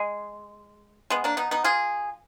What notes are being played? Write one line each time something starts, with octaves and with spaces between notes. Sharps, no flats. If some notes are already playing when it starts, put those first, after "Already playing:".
Already playing: G#3
G#3 B3
A#3 D4
B3 D#4
B3 D#4
F4 G#4